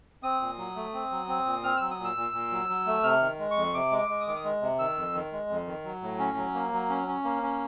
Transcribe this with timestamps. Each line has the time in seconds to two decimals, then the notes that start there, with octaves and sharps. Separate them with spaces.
0.23 C4 D#6
0.41 A#2
0.58 F#3
0.76 A3
0.94 C4
1.11 F#3
1.28 C4
1.45 A#2
1.63 C4 F6
1.77 F#3 E6
1.91 D#6
1.99 A#2
2.04 E6
2.16 A#2
2.33 A#2
2.51 F#3
2.69 F#3
2.86 A3
3.03 C3 F6
3.21 D#3
3.39 G#3
3.51 C#6
3.56 F2
3.74 C3 D6
3.91 G#3
3.98 D6
4.09 G#3
4.20 D#6
4.27 D#3 D6
4.36 D#6
4.44 G#3
4.62 C3
4.79 D#3 E6
4.96 F2
5.14 D#3
5.32 G#3
5.50 F2
5.67 D#3
5.84 F#3
6.02 A2
6.19 C#4
6.37 F#3
6.55 A#3
6.72 F#3
6.89 C#4
7.08 C#4
7.24 A#3
7.42 C#4